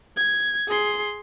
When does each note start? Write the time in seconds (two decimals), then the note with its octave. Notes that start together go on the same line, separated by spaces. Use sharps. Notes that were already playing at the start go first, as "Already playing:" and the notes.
0.17 G#6
0.68 G#4 C6